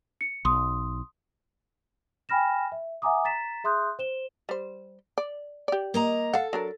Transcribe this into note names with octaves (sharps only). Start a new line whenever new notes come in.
C#7
B1 C6 D#6
G5 G#5 B5 F6 A#6 E7
E5
E5 F#5 G#5 A#5 D6 D#6
A#5 A6 B6 E7
G#4 E5 C6 D#6 F#6 G6
C5 E7 G7
G3 C5
D5
G4 D5
A#3 D#5 A#5
A4 F5 F#5
F#3 D4 A#4